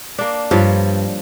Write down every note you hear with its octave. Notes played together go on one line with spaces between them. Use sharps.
A#3 D4
G2 F3 C#5